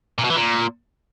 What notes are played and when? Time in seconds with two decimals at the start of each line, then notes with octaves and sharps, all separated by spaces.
0.18 A#2
0.24 B2
0.30 E3
0.36 A#2